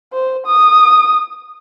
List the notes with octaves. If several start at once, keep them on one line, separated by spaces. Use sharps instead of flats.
C5
D#6